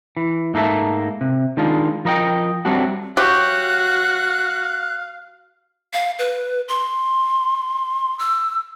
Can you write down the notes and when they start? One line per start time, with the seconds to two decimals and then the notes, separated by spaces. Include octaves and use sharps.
0.17 E3
0.54 G#2 A3 A#3 D#4 E5 A5
1.21 C3
1.57 D#3 G#3 D4 F4
2.05 F3 A#4 D#5 E5 G5
2.65 F#3 G3 A3 C4 D4 F#4
3.17 F#3 F#4 G4 F5 F#6
5.93 F5
6.19 B4
6.68 C6
8.19 E6